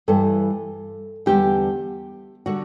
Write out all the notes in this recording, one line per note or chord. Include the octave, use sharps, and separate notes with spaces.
G2 E3 G3 A4
E2 D3 G3 G4
D3 G3 F#4